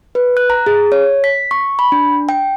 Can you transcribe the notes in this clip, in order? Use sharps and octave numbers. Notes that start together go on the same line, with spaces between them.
B4
F#6
A#5
G#4
C#5
B6
C#6
B5
D4
G5